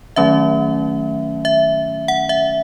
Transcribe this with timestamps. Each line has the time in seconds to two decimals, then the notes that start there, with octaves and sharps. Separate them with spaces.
0.16 D#3 F#3 A3 C#4 E5
1.45 E5
2.08 F#5
2.29 E5